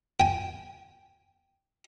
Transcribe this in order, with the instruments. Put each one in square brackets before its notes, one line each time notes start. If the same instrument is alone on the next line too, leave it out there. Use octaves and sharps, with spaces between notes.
[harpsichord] G5 G#5